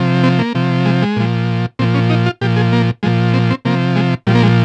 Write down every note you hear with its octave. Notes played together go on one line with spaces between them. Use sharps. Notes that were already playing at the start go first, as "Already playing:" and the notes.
Already playing: C3 F3
C4
A#3
C3 F3
G#3
G#3
A#2 F3
A#2 F3 C4
C#4
D#4
F4
A#2 F3 G4
G#4
A#3
A#2 F3 G#3
C4
C4
C3 F3 A#3
G#3
A#2 F3 G3
A#3
G#3